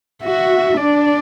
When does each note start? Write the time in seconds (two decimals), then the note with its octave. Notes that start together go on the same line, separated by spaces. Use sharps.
0.23 F#4 E5
0.77 D4 D5